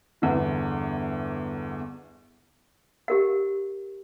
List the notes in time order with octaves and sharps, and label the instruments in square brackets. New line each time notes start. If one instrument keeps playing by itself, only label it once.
[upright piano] G1 E2 D3
[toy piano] G4 A#4 F#5